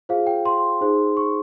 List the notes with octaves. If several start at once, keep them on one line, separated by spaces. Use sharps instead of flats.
F4 G#4 C5 F5
G5
C6
D#4 G#4 C5
C#6